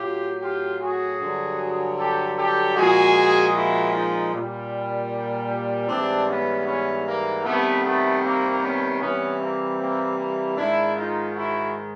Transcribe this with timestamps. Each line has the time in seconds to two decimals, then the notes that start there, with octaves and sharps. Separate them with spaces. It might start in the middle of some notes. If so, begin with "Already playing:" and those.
Already playing: A2 F#3 F4 G4
0.42 F4 G4
0.81 F#4 G#4
1.20 G2 D3 F#3
1.98 G4 A4
2.37 G4 A4
2.76 A#2 F3 G#3 F#4 G#4
3.54 E4 F#4
3.93 D#4 F4
4.33 A#2 G3
5.89 G#2 E3 G3 C4 D4
6.28 B3 C#4
6.67 B3 C#4
7.06 A#3
7.45 C3 D#3 G3 A3 B3
7.84 A3 B3
8.23 A#3 C4
8.62 B3 C#4
9.01 C3 E3 G3 B3 C#4
9.40 A#3 C4
9.79 A#3 C4
10.18 A#3
10.57 G#2 D#3 G#3 D4 E4
10.96 D#4 F4
11.35 E4 F#4